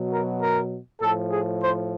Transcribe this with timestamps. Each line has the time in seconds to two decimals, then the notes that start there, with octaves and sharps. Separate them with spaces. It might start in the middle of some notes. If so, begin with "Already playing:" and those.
Already playing: B2 F#3
0.11 A#4
0.41 A#4
1.01 A2 F3 A4
1.31 G#4
1.61 C5